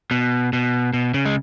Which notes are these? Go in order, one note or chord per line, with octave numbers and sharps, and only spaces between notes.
B2
B2
B2
C#3
G#3